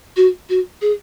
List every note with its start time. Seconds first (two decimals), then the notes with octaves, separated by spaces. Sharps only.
0.17 F#4
0.49 F#4
0.82 G#4